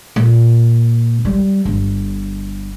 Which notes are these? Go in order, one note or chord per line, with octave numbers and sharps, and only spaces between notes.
A#2
G3
G1